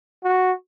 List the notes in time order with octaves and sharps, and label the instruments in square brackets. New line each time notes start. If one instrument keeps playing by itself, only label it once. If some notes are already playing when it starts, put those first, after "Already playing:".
[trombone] F#4